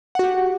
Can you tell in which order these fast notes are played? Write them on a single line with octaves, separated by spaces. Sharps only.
F#5 F#4 G4